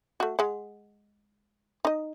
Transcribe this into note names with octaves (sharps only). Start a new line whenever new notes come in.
A3 F#4
G#3 F#5
D#4 D#5